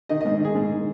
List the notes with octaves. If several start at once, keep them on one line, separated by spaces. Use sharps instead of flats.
D#3 D#5
G#2 D#5
D#3 G#4
G#2
D#3